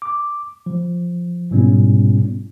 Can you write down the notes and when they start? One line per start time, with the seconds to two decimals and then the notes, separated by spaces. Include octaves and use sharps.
0.02 D6
0.66 F3
1.51 G#2 B2 G3 B3 C#4 E4